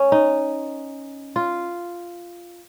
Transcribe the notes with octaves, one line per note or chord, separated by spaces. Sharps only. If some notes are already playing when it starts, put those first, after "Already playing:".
Already playing: C#4
D#4
F4